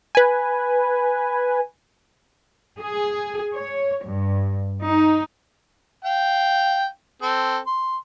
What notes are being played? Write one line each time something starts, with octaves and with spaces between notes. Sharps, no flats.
B4 G#5
G#4
C#5
G2
D#4
F5 G5
C4 A4
C6